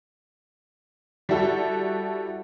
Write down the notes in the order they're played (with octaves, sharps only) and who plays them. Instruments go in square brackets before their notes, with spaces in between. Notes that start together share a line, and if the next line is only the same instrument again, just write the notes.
[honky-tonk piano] G3 E4 F#4 A4